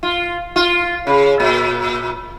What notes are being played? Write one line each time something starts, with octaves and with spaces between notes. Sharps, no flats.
F4
F4
C#3
A#2